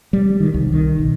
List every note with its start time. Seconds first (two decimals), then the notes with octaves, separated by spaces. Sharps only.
0.13 G3
0.40 D#3
0.54 C2
0.72 D#3
0.98 B1